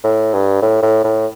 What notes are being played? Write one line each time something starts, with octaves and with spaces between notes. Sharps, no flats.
A2
G2
A2
A2
A2